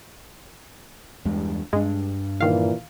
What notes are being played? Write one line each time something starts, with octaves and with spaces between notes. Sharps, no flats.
E2 G2 G#3
G2 G#3 D4
A#2 D#3 E3 F5